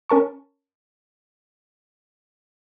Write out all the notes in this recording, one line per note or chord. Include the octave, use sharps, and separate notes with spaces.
C#4 A#4 A5 C#6